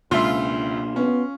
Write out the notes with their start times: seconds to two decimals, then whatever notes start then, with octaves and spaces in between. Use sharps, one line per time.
0.11 C#2 B2 A#3 D4 F4 E5
0.96 B3 C#4